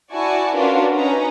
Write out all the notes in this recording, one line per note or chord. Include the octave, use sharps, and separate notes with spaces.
E4 F#4 D5 G#5 A5 C#6
C#4 D4 F4 F#4 A#4 B4
C#4 D#4 B4 A#5